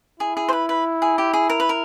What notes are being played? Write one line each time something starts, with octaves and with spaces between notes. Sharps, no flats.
E4 G#4
G#4
C5
B4
B4
G#4
G4
G#4
A#4
B4
A#4